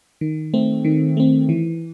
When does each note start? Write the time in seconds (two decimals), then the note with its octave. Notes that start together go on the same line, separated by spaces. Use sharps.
0.21 D#3
0.54 A3 C4
0.85 D#3
1.17 A3 C4
1.49 E3